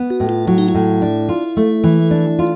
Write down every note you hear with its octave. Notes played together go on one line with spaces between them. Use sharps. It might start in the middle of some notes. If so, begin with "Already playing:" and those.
Already playing: B3
F#4
A2
F4
F#3 E4
D#4
E4
A2
D4
F4
A3
E3
D4
F4